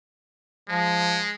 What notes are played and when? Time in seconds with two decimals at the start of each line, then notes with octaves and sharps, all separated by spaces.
0.69 F3 G#3